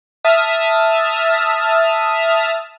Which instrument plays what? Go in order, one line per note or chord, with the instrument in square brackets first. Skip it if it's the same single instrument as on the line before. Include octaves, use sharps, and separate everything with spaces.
[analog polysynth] E5 A5 D#6 F6